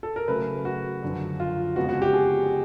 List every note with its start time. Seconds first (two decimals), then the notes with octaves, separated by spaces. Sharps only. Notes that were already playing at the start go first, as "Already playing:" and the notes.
0.03 A4
0.16 A#4
0.28 C#3 F#3 A3 B4
0.65 F#4
1.03 F#2 D3 F3
1.40 F4
1.76 F2 C#3 F3 G#3 B3 F#4
1.89 F#4
2.02 G4
2.14 G#4